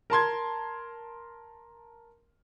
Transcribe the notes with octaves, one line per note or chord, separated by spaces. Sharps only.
A#4 A5 C6 G#6